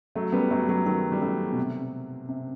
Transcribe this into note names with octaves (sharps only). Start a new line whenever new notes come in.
F#3 A3
G3 B3
F#3 A3
F#3 A3
D#3 F#3
G3
F#3 A3
B2
C3
C3